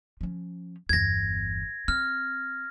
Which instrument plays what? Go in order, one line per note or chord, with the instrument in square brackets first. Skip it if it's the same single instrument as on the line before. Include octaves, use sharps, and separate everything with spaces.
[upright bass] F3 C#4
[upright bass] G1 E2 [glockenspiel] G#6 A#6
[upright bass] C4 [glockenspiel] F6